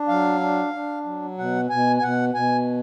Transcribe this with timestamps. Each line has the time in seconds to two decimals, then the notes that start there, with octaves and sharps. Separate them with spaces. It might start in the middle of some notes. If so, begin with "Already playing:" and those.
Already playing: D4
0.08 F#3 F5
0.40 D4
0.73 D4
1.05 F#3
1.38 B2 F#5
1.70 B2 G#5
1.99 G#5
2.02 B2 F#5
2.34 B2 G#5